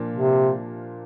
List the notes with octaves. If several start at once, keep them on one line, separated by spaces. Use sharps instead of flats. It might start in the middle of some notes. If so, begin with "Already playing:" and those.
Already playing: A#2 F3 A#3 D4 F4
C3